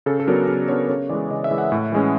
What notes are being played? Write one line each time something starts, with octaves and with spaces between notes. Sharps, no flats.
C#3 A4
A4
F#3 B3 D4 A#4
C#3
F#3 B3 D4 C#5
C#3 C#5
E3 G#3 D5
C#3 D#5
E5
E3 G#3
F#5
A2
E3 G#3 C#4